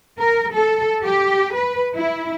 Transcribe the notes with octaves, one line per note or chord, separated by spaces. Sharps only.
A#4
A4
G4
B4
E4